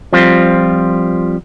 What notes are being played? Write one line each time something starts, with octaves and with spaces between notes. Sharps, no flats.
F3 G3 C4 F4